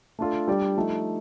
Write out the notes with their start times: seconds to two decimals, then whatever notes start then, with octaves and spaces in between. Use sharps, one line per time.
0.19 A3 D4 F4 A4
0.48 G3 D4 G4 D5
0.76 F3 A3 D#4